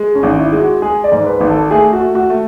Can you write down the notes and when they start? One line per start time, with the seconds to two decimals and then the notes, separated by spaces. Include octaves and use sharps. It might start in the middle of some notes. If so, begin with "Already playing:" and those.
Already playing: G#3
0.15 C#4
0.23 G#1
0.38 E4
0.52 G#3
0.59 F#4
0.82 G#3 G#4
1.04 D5
1.12 G#2
1.26 B4
1.41 G#1
1.49 A4
1.71 A3 G#4
1.93 F#4
2.00 A3
2.15 F#4
2.30 A3